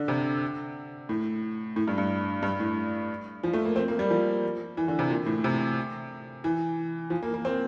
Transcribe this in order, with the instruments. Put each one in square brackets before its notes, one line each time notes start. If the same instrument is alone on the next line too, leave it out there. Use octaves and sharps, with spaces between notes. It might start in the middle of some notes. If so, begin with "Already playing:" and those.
Already playing: [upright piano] D3
C3
A2
A2
G2
G2
G2
A2
F3
A3
A#3
C4
A#3
G3
F3
E3
D3
C3
A#2
A2
C3
E3
F3
A#3
A#3
C4